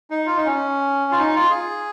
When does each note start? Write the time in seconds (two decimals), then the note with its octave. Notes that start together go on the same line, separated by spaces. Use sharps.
0.10 D#4
0.26 F4
0.36 D#4
0.46 C#4
1.12 F4
1.19 D#4
1.35 F4
1.50 G#4